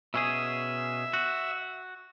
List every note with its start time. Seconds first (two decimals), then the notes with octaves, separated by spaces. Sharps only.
0.14 B2 C#4 G#4 E5
1.13 F#4